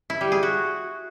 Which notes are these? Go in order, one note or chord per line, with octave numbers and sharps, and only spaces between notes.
E4
G3
G#4
F#4